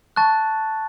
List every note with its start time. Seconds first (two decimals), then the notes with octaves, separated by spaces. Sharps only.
0.16 A5 C#6 F#6 A6